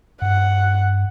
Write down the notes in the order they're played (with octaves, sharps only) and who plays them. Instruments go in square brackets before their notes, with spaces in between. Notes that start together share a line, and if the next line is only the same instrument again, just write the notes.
[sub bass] G2 [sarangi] F#5